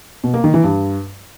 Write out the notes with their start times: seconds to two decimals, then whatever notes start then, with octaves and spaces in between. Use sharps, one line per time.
0.24 B2
0.34 A#3
0.44 D#3
0.54 E3
0.64 G2